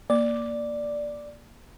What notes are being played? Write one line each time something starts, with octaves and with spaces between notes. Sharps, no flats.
A#3 D5